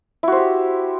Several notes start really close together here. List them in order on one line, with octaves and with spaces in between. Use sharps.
E4 F#4 C5 G4